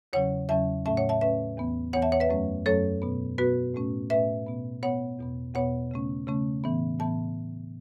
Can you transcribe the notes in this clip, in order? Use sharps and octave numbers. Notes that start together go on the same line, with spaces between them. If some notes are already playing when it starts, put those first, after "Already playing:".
E2 C#3 F#3 C#4 C#5 F#5
E2 C#3 F#3 C#4 E5 A5
A2 A3 C#4 E5 A5
C#5 F#5
E5 A5
A2 A3 C#4 B4 E5
E2 E3 B3
E2 E3 B3 C#5 F#5
E5 A5
C#5 F#5
B4 E5
F#2 F#3 A3 C#4
F#2 F#3 A3 C#4 A4 C#5
B2 B3
B2 B3 F#4 B4
A2 A3 C#4
A2 A3 C#4 B4 E5
B2 B3
B2 B3 C#5 F#5
E2 B2 B3
E2 B2 B3 C#5 F#5
C#3 A3 C#4
C#3 A3 C#4
A2 E3 B3
A2 E3 B3 A5